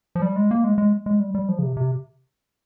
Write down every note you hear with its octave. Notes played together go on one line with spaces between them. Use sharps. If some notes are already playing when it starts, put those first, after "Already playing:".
F3
G3
G#3
A#3
G#3
G#3
G#3
G3
G3
F3
C#3
C3
C3